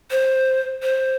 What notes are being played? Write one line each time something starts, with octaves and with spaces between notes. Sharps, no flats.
C5
C5